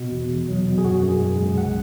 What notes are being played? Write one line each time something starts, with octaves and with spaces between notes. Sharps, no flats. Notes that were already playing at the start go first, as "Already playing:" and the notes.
Already playing: B2
E2
E2
F#3
B2
G#4
F#2 F#4
F#2
G#4
G#3
C#3
B1 F#5